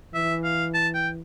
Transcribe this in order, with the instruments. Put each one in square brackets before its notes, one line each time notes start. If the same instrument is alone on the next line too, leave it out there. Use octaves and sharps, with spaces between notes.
[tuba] E3 [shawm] E5
[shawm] F5
A5
G5